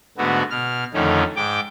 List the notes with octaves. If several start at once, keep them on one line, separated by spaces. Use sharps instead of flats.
G#2 D3 A3 B3 F#4
B2 F6
F2 D3 D#3 A3 C#4 D#4
G#2 G5 D6